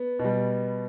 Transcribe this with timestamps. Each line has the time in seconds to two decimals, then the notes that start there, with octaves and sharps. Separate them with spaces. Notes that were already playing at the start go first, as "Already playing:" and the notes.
Already playing: B3
0.19 B2
0.24 G3